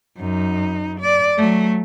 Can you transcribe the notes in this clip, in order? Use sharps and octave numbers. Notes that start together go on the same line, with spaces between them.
F#2 D#4
D5
F#3 A3